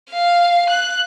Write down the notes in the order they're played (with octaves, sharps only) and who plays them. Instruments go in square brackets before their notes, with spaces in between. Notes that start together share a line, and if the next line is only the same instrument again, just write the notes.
[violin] F5
F#6